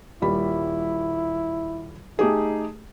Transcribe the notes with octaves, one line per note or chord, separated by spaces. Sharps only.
D#1 G3 E4 B5
A3 D#4 G4 G#4